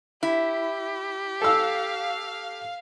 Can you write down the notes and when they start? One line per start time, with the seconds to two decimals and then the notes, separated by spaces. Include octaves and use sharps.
0.23 E4 G4
1.42 A4 F5 E6